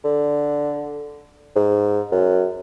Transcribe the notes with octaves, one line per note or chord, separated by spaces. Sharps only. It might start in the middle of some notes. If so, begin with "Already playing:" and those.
D3
G#2
F#2